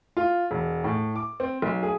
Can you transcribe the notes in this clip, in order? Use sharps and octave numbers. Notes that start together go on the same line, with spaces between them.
F4
E1
A2
D6
C4
B1
G#4